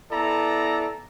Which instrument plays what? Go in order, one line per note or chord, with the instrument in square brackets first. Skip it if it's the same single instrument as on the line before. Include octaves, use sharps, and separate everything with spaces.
[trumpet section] B3 E4 A4 D5 A#5